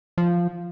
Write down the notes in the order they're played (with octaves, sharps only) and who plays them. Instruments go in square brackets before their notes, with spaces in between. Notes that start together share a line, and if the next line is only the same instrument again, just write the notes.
[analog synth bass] F3